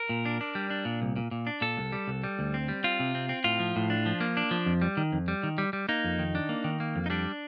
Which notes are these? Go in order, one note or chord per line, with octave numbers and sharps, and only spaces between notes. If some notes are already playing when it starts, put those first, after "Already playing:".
Already playing: A#4
A#2
D4
D4
G3
D4
A#2
C2
A#2
A#2
D4
A#2 A4
C2
G3
C2
G3
D2
C4
G3
C4 F4
C3
C4
C4
A2 F4
F3
A2
D4
F3
A#3
D4
F3
F2
G3
D#3
F2
G3
D#3
G3
G3
A#3 D#4
F2
D#3
D4
A#3
D#3
A#3
F2
D#4
G3 D4